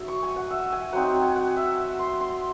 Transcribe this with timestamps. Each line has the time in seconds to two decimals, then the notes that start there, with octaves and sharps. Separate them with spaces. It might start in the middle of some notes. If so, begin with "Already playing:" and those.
Already playing: F#3 D#4 E5
0.08 C#6
0.23 G#5
0.36 F#5
0.50 E5
0.72 G#5
0.93 F#3 C4 D#4 F#5
1.07 G#5
1.21 G#5
1.36 F#5
1.56 E5
1.99 C6
2.20 C6